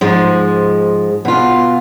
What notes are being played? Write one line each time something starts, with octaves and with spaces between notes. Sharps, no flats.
G#2 F3 G#3
B2 F4